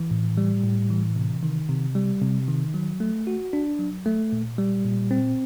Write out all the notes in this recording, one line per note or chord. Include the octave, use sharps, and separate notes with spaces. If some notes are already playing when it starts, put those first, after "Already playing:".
Already playing: E3
A2
G3
A2
E3
C3
D#3
C3
G3
C3
D#3
F#3
A3
F#4
D4
F#3
A3
A#2
G3
A#2
C4